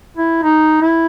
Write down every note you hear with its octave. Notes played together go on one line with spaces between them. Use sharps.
E4
D#4
E4